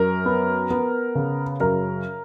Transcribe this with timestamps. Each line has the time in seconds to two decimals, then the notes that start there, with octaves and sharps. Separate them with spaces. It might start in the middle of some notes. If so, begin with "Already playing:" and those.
Already playing: F#2 A#4
0.26 B3
0.71 B3
1.15 C#3
1.60 F#2 A#4